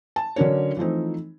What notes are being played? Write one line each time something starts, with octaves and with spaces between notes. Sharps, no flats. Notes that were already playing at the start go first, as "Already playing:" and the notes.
A5
D3 F#3 C#4 D4 A#4 C#5
E3 F3 A3 C4 D#4